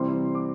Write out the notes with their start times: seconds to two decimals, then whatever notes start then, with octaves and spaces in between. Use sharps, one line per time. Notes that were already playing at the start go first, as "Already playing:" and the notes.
Already playing: C3 E3 G3 C4 C6
0.35 D6